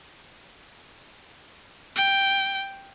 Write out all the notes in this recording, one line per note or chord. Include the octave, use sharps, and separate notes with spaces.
G5